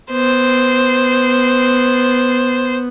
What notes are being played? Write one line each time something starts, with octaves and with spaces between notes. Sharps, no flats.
B3 C5